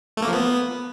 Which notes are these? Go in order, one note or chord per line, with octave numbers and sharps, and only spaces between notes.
A3
A#3
F3
B3